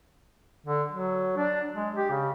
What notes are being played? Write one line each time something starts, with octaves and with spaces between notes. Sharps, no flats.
D3
F#3
D4
G#3
G4
C#3